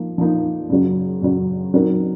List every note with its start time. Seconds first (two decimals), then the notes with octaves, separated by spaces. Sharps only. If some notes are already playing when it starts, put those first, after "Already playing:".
Already playing: F3 A#3 D#4
0.18 F3 A#3 D#4
0.69 F#2 C#3 F#3
1.22 F#2 C#3 F#3
1.74 F#3 C4 D#4 A#4